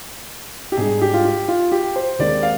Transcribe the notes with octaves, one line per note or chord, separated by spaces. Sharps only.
G4
G#2 G3 D4 G#4
G4
F4
G4
F4
G4
C5
D#2 D#3 G#3 C4 D5
F5